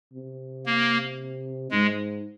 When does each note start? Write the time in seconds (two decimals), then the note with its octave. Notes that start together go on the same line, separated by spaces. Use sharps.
0.13 C3
0.66 A#3
1.71 G#2 G#3